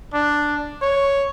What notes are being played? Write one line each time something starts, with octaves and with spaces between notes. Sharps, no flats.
D4
C#5